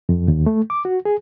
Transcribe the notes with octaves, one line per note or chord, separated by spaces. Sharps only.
F2
D#2
A3
D6
F#4
G#4